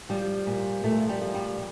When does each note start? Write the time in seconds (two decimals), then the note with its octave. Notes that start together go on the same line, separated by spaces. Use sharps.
0.09 F3 G3
0.46 A#2
0.84 A#2 A3
1.09 G3
1.21 F3
1.34 G3